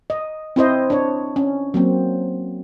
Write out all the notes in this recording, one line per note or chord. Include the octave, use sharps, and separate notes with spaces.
D#5
C4 E4 C5 D#5
D4 C#5
C#4
F#3 A#3 C4